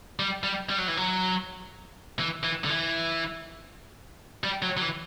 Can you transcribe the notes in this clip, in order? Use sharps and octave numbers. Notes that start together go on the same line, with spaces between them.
G3
G3
G3
F#3
E3
F#3
E3
E3
D3
E3
G3
F#3
F#3
E3